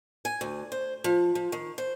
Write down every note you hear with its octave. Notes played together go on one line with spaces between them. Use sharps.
G#5
D2
C5
F3
F3
D#3
C5